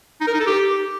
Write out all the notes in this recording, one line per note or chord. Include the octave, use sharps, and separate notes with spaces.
D#4
A#4
D#4
A4
G4